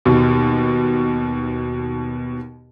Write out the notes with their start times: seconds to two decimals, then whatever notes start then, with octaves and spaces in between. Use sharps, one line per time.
0.05 D#2 B2